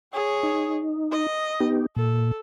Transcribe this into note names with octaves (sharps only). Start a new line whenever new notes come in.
G#4 C#5
D#4
D#5
B3 D#4 G4
A#2 A4